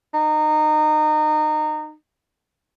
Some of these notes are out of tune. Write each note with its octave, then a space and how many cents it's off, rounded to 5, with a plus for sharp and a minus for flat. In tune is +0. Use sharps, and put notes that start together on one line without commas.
D#4 -25